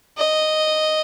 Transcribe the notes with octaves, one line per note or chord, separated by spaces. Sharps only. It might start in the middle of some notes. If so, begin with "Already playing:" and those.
D#5